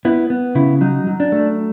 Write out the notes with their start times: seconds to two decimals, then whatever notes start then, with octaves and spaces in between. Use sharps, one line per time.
0.05 B3 E4
0.30 B3
0.55 C#3 E4
0.81 F#3 D#4
1.07 F#3
1.20 D4
1.32 A3